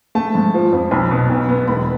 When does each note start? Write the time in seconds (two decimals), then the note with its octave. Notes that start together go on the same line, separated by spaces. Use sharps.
0.15 A3 A5
0.35 G#2
0.54 F3
0.72 F2
0.91 B1 B5
1.11 B2
1.30 B1
1.49 B3
1.67 E1 B5